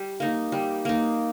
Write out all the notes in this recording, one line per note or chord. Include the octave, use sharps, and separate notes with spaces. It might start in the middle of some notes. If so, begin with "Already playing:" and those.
Already playing: G3
A#3 D#4
G3
A#3 D#4